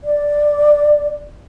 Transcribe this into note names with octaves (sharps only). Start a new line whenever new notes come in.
D5